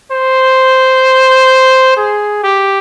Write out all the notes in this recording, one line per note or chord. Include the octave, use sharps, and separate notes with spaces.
C5
G#4
G4